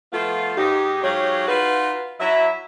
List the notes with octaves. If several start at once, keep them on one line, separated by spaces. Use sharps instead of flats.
F3 A3 B3 F4
G#2 D#4 G4
G#2 F#3 G4 G#4 C#5 F5
D#4 F4 F#4 B4
F#3 E4 E5